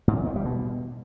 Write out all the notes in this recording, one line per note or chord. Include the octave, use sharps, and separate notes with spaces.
G#2
E2
D#3
G3
B2